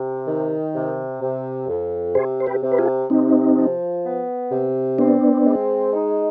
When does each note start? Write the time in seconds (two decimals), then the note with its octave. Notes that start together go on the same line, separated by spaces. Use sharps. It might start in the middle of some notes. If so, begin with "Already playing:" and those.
Already playing: C3
0.26 D#3
0.74 C3
1.21 C3
1.68 F2
2.15 C3 G#4 C5
2.40 C5
2.46 G4 B4
2.62 C3
2.72 B4
2.78 F4 G#4
3.10 C3 C4 D#4
3.57 F3
4.04 B3
4.51 C3
4.99 B3 C4 D4
5.46 G#3
5.93 D#4